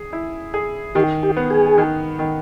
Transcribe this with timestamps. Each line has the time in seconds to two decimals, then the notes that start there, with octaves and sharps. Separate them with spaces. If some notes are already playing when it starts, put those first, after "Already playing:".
Already playing: G#4
0.13 E4
0.54 G#4
0.95 D#3 G4
1.23 G4
1.37 B3
1.50 G#4
1.78 D#3
2.19 D#3